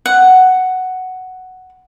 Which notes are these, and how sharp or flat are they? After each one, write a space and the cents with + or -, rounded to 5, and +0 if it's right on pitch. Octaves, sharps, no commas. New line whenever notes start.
F#5 +5